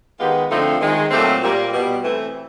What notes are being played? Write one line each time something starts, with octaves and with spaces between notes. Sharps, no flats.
D#3 G#3 B3 F4 G4
D3 F3 A3 C4 D#4 F4
D#3 G#3 C4
A#2 F#3 A3 C4 G4 A4
A#2 G3 A#3
B2 G3 B3
E3 A3 C4